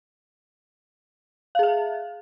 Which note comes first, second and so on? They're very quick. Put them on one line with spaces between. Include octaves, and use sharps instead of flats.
F5 G#4 E5